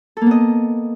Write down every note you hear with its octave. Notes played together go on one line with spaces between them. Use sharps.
A#3 B3 A4 D#5